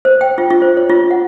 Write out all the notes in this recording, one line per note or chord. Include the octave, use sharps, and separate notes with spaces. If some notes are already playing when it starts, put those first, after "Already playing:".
C5
G5
F4
F4
C5
C#5
F4
F#5